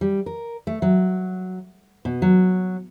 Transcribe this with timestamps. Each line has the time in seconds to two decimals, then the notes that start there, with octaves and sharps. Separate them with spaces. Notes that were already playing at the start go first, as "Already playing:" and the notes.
0.01 G3
0.26 A#4
0.67 A3
0.82 F#3
2.05 B2
2.22 F#3